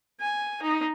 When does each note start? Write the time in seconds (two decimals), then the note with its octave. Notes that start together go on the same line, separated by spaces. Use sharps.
0.20 G#5
0.63 D#4